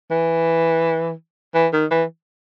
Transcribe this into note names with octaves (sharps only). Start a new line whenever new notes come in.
E3
E3
D#3
E3